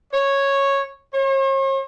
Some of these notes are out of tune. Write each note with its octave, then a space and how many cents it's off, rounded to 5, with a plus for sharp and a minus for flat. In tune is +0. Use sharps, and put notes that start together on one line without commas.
C#5 -10
C#5 -45